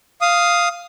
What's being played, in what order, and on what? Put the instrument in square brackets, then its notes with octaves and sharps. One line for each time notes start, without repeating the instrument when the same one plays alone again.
[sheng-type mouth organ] F5 D#6